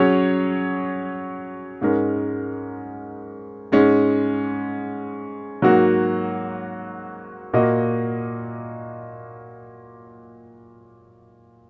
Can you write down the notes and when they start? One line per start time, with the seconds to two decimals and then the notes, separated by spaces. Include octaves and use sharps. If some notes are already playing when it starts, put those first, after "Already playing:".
Already playing: F#3 C#4 G#4 C#5
1.81 G#2 G#3 C#4 A#4
3.72 G#2 G#3 C#4
5.62 G#2 F#3 A#3 F#4
7.53 A#2 A#3 F#4 D#5